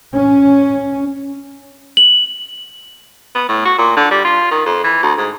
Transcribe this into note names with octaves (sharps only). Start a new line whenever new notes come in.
C#4
F#7
B3
A2
F#4
A#2
D3
G3
F4
D#3
F2
E3
D2
G#2